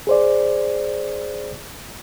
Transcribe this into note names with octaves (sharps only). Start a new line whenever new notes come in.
G#4 C5 D5